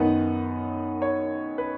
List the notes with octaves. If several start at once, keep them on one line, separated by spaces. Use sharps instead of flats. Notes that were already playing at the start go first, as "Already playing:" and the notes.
Already playing: F#2 D#3 B3 D#4 F#5
C#5
B4